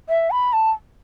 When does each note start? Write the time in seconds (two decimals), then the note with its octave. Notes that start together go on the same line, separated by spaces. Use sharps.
0.09 E5
0.31 B5
0.53 A5